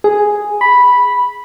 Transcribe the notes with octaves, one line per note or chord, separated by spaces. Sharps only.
G#4
B5